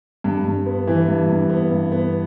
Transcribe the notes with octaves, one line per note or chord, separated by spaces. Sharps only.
G2
G2
B3
E3
G2
G2
B3
G2
B3